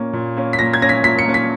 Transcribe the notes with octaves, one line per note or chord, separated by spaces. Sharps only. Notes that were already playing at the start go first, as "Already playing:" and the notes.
Already playing: A#2 A#3 C#4
A#2
A#3 C#4
B6
A#2 A#6
G#6
A#3 C#4 A#6
B6
A#2 B6
C#7
A#3 C#4
B6